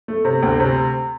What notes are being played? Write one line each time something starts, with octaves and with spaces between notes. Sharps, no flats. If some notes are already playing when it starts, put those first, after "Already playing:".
A3
C3
D2
C3